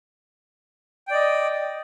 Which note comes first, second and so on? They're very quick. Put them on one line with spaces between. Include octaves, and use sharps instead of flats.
G5 D5 D#5